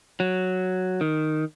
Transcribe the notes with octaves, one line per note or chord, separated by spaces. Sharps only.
F#3
D#3